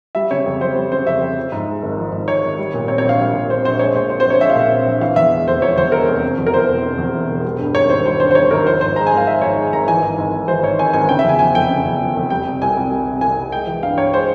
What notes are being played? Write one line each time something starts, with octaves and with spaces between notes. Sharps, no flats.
G3 E5
C#3 C#5
F2
F2 C5
G3
C#3 C5
F2 E5
F2
F3
G#2
G#3
G#1
F3
G#2
G#3 C#5
G#1
G3
A#2
C4 C#5
C#5
A#1 F5
G3
A#2
C4 C5
A#1 C5
G#3 C#5
A#2 C5
C4 C5
C5
A#1 C#5
G#3 E5
F5
A#2 E5
C4
A#1
E3 F5
E2 E5
G#3
F1 C5
E3 C#5
E2 C5
G#3 A#4
F1
C3
E2
A#4
E3 C5
E1
C3
E2
E3
E1
G3
G2
G#1 C#5
G#1 C5
G3 C5
G2 C5
C5
G#1 C#5
G#1 A#4
F3 C5
G#2 C5
G#3 A#5
G#5
G#1
F5
F3 E5
G#2 C#5
G#3
G#1 A#5
E3 G#5
G#2
G#1
G#1
E3 C5
G#2 C#5
G#1 G#5
G#1 G#5
C#3 G5
E5
E2 G#5
F3 G#5
F1 G5
C#3
E2
F3
F1
G3 G5
C3
C2 G#5
C2
G3
C3
C2 G#5
C2
G#3 G5
E3
G2 F5
G2 C#5
G#3 C5